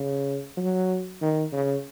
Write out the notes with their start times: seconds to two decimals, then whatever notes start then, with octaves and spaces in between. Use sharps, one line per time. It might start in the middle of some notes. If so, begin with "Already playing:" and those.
Already playing: C#3
0.57 F#3
1.21 D#3
1.53 C#3